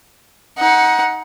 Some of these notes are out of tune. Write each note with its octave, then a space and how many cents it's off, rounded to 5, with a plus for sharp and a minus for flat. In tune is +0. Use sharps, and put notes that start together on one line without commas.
D#4 +25 F#5 +0